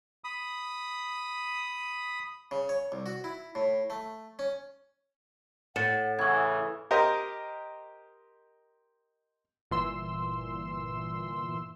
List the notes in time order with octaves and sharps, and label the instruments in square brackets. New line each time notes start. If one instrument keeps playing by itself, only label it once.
[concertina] B5 D#6
[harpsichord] C#3
C#5
C2
F#4
E4
A2
A3
C#4
[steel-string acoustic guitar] A2 [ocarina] F#5 [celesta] A6 C#7 E7
[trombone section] C#3 E3 [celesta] C#6 G#6
[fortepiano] G4 A#4 C5 D#5
[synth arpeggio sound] G1 A#2 E3 C6 E6